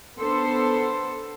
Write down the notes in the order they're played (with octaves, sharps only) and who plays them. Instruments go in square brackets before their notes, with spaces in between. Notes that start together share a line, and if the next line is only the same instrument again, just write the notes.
[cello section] B3 D4 A4 C5